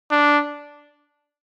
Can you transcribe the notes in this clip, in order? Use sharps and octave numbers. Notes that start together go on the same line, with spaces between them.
D4